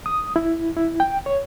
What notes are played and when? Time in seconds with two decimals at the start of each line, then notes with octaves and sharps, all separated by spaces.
0.06 D#6
0.36 E4
0.77 E4
1.00 G5
1.26 C#5